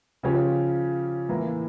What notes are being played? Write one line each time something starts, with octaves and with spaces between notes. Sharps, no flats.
C#3 F3 C#4 G4
A2 E3 A#3